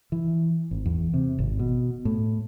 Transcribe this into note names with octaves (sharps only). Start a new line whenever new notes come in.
E3
G#1
E2
C3
G#1
B2
A2